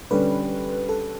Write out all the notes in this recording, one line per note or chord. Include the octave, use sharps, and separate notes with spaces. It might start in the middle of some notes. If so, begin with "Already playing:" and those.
D3 G3 C#4 B4
A4